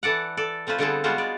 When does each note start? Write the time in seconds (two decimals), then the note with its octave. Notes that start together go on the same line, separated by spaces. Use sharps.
0.03 E3 A4 D5 F#5
0.37 A4 D5
0.67 A3 C4 F4 B4 C5
0.78 D3 G3 B3 C4 G#4 A4
1.04 G3 G#3 B3 F4 F#4 C5
1.18 G#3 D5